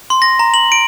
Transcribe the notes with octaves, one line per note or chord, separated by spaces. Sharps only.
C6
A#6
A#5
F#7
D7